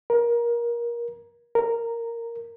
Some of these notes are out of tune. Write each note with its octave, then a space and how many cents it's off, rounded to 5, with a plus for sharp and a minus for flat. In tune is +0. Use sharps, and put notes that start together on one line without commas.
A#4 +20
A#4 -10